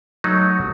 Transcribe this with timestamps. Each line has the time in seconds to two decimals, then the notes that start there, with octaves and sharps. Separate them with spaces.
0.24 F#3 A3 D#4 F#4